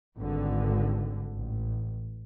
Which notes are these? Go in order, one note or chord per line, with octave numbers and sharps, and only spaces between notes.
G#1 G2 D3
A1